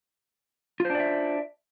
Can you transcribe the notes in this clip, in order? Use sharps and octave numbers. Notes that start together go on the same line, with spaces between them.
D4 F4 C5 D5 E5